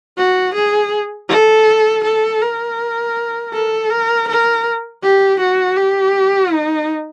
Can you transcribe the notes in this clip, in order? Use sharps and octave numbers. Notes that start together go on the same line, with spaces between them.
F#4
G#4
A4
A4
A#4
A4
A#4
A#4
G4
F#4
G4
D#4